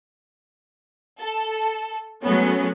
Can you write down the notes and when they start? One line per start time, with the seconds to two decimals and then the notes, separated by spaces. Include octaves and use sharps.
1.20 A4
2.23 F#3 G#3 A3 B3 C#4